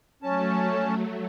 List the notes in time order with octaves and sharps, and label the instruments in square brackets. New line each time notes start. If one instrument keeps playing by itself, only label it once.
[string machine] F#3 A3 [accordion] C#4 A5